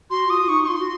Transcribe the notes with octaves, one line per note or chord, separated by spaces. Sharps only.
F#4 C6
F4 D#6
F4
D#4 C#6
C#6
F4 C6
F#4